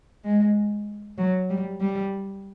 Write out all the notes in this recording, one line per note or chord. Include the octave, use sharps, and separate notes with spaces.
G#3
F#3
G3
G3